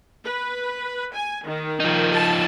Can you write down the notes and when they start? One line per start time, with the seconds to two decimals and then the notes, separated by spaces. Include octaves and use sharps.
0.24 B4
1.14 G#5
1.45 D#3
1.80 F3 D#4
2.12 A5